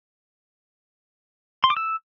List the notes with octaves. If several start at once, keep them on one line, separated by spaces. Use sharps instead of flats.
C6
D6
E6